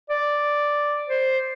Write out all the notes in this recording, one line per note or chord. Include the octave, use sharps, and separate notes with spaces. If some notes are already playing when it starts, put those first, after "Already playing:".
D5
C5